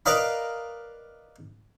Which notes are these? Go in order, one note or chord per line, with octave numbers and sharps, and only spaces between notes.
A#4 B4 D5 D#5 F5 B5